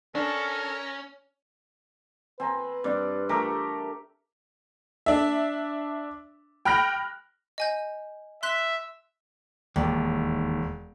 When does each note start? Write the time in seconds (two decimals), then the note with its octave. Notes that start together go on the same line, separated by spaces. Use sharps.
0.15 C#4 D4 A4 A#4
2.40 C4 B4 G#5 A#5
2.84 G2 C4 D5
3.29 A3 G4 A#4 A#5
5.06 D4 E5
6.65 G5 B5 F6 F#6 A#6
7.58 D#5 G#5 G6
8.43 E5 C6 F#6 B6
9.76 E1 D#2